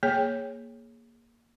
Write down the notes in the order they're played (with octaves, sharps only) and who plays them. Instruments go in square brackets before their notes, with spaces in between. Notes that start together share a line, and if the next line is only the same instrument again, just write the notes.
[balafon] A#3 G#4 C#5 G5